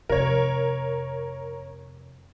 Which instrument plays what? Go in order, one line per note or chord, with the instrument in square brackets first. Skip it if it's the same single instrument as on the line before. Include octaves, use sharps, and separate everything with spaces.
[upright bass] F2 C3 [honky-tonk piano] A#4 C#5